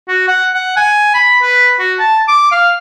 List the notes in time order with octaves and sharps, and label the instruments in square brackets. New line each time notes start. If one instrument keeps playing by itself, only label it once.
[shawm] F#4
F#5
F#5
G#5
B5
B4
F#4
A5
D6
F5